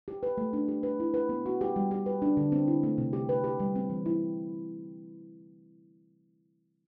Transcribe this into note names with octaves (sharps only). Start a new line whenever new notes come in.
G4
B4
A3
D4
G4
B4
E4
B4
B3
F#4
G4
G3
G4
B4
D4
D3
C4
E4
A3
C3
G4
B4
G4
G3
C4
E3
E4